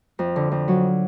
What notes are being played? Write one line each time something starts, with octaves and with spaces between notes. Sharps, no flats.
F2
D3
F2
F#3